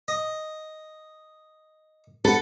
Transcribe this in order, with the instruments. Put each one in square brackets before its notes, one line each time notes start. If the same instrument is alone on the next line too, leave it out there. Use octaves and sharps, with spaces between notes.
[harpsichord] D#5
[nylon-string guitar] A4 [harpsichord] B4 F#5